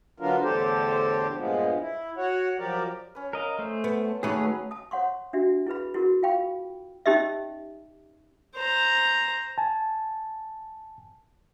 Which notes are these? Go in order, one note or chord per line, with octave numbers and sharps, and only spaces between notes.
D3 F#3 B3 D4 F4 A#4
E2 A2 D3 G4 A4 C5
G2 A#2 F3 G#3 B3
E4
F#4 C#5 F#5
F3 F#3 G4 A#4 D5
C#4 B4
A#4 D#5 F5
A3 C5
B3
C#5 A5
D#2 F#3 A3 C#4 G#4 B4 C#5
A5 D#6
C5 C#5 F#5 C6 C#6
D4 F#4 G4 E5
E4 G#4 B4 B5
E4 F#4 G#4 A#4
F4 F5 G5 B5 C#6
C#4 D#4 G4 D#5 E5
C5 A#5
G#5 A5